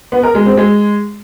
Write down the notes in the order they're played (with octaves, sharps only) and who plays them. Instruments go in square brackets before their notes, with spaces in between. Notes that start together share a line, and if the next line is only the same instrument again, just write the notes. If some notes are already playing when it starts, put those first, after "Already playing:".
[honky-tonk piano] B3
A#4
G#3
C4
G#3